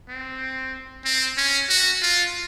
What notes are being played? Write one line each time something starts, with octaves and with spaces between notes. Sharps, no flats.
C4
C4
C#4
F#4
F4